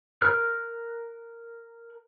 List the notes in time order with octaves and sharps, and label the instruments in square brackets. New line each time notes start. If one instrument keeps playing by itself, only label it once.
[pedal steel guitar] A#4 F6 F#6